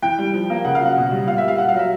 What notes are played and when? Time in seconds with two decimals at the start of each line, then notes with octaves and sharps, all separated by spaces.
0.02 E3 G5
0.18 G3
0.34 F3
0.50 A#3
0.65 C#3 F#5
0.75 F5
0.80 F#3
0.86 F#5
0.97 B2
1.11 G3
1.27 A#2 F5
1.38 E5
1.43 G3 F5
1.58 A#2 F#5
1.69 F5
1.74 F#3 E5